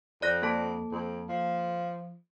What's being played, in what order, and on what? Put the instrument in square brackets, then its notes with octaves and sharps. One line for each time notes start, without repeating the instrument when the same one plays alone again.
[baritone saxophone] F2 [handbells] D5 F#6 A#6
[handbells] A#3 A4 A5
[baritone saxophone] F2
F3